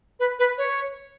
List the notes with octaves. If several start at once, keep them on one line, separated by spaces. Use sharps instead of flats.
B4
B4
C#5